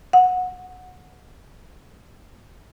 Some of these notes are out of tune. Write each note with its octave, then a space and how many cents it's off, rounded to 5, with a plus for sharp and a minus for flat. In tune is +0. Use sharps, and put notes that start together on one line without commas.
F#5 -20